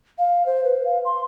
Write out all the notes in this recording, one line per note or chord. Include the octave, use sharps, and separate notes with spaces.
F5
C5
B4
F5
C6